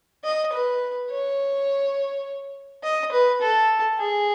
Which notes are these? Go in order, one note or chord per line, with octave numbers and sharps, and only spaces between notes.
D#5
B4
C#5
D#5
B4
A4
G#4